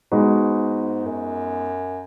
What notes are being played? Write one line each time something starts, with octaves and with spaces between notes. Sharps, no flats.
G#2 G#3 B3 D#4 F#4 B4
F#2